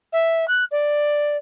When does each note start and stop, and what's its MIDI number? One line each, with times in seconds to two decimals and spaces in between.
0.12 0.45 76
0.48 0.64 90
0.71 1.37 74